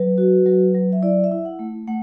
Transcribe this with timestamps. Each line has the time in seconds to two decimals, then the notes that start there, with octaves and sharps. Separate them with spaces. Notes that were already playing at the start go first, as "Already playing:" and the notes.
Already playing: F#3 B4
0.18 F#4
0.46 F#3
0.75 F#3
0.92 E5
1.02 E4 D5
1.24 E5
1.32 E4
1.45 F#5
1.59 A3
1.88 A3 F#5